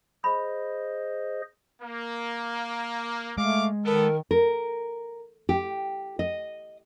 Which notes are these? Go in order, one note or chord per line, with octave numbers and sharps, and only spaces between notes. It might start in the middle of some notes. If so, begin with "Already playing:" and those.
G#4 C5 D#5 B5
A#3
G#3 A3 F5 D6
D#3 B3 A4 A#4
A#4
G4
D#5